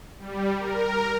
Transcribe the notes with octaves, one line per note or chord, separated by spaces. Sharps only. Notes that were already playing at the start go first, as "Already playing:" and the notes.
G3
A#4